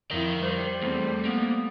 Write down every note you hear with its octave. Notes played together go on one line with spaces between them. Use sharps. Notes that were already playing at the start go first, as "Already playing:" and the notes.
F2 E4 A#4 G5
G3 C5
E2 A3 C4
A#3 B3